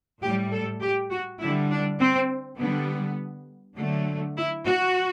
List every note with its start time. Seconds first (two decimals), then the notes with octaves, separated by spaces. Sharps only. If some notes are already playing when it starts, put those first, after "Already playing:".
0.21 A2 G3 G4
0.52 A4
0.81 G4
1.10 F#4
1.40 D3 G3 E4
1.70 D4
1.99 C4
2.58 D3 G3 B3
3.77 D3 F#3 A3
4.37 E4
4.66 F#4